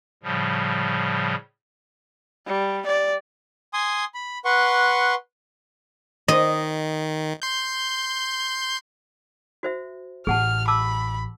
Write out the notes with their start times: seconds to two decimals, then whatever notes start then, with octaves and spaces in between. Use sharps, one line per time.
0.23 A2 C#3 F3 G3
2.47 G3
2.86 D5
3.74 G#5 C6 D#6
4.14 B5
4.45 B4 F#5 C6 C#6
6.28 D#3 D#5
7.42 C6 G6
9.63 F#4 C5 E5
10.27 A1 G#4 F#5 A5 F6
10.68 A5 B5 D6 E6